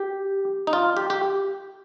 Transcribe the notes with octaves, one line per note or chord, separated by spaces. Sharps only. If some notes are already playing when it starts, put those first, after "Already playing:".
Already playing: G4
D#4
F4
G4
G4